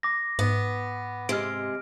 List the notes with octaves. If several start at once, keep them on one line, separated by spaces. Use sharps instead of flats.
D6 A#6
G#2 B3
C3 G#3 F6 D7